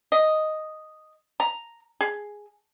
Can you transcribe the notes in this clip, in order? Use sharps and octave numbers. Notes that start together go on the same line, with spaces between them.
D#5
A#5
G#4